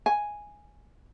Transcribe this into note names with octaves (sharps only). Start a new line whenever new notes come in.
G#5